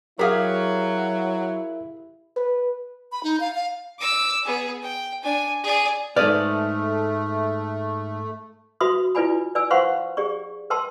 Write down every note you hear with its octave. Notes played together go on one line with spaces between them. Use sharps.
F#3 E4 G4 G#4 A#4 F5
B4
B5
D#4
F5
F5
D6 E6
B3 G#4
G5
D4 G#5
G#4 D5
G#2 A3 B4 D5 D#6 F6
F#4 B4 E5 B5 C6 D#6
E4 F4 B4 D5 G#5 B5
B4 D5 G#5 E6
B4 C5 F5 F#5 C6 C#6
G4 G#4 D5 C#6
A#4 B4 G5 A5 C6 E6